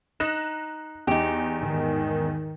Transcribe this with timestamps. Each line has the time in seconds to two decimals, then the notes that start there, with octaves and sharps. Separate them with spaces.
0.20 D#4 F#6 A#6 E7
1.07 E2 D#4 G4
1.59 G#2 D#3